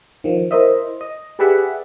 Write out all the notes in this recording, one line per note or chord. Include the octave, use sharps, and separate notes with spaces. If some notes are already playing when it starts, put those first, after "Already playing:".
D#3 F3
E4 A#4 C5 D#5 E5
D#5
G4 G#4 B4 D5 E5 F#5